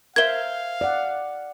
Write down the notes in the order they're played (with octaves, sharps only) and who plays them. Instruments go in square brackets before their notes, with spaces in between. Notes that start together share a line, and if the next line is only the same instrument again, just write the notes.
[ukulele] A#4 C5 E5 [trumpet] F5 [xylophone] G#6 G7
[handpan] D5 F#5